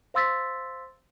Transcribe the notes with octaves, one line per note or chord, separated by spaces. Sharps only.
C5 F5 C6 E6 A6 B6